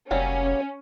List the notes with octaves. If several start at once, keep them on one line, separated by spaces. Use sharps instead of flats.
F1 F#3 G3 A#3 C#4 C#5